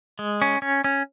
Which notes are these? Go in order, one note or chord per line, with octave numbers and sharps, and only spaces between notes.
G#3
C#4
C#4
C#4